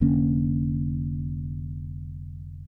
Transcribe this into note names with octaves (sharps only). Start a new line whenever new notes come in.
F1 D3 A#3 C#4